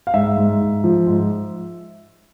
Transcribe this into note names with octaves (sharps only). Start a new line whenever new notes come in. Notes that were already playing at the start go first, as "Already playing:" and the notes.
F5
G#2 E5
G#2
G#2
F3
G#2